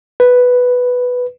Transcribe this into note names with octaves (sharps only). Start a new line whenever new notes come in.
B4